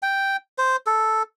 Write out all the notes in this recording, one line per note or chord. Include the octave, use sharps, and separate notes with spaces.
G5
C5
A4